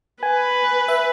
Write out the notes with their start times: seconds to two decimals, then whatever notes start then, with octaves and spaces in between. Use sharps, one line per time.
0.23 B4 G#5
0.88 E5